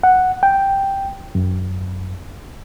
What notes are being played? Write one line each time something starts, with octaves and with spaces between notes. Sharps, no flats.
F#5
G5
F#2